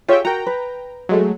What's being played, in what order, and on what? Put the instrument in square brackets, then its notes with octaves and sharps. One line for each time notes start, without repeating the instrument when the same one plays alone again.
[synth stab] F4 E5 G5 [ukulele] G4 G#4 C#5
[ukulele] F#4 A#4 [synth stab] G5 A#5
[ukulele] B4
[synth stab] F#3 G#3 A3